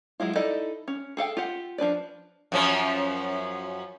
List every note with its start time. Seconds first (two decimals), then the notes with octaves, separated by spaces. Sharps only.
0.20 F#3 G#3 E4 F4
0.36 D#4 E4 A4 D5 D#5
0.88 C#4
1.17 G#4 A4 F5 G5
1.37 F4 G4 F#5
1.78 F3 D4 B4 D5
2.52 F#2 F3 C#4